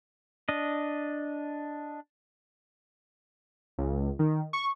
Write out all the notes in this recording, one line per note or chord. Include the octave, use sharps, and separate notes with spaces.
D4 D#5
C#2
D#3
C#6